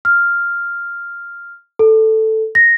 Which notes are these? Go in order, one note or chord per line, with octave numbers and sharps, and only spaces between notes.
F6
A4
A#6